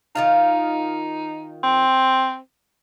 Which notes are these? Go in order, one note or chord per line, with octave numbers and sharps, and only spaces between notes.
D#3 D#4 F4 F5
C4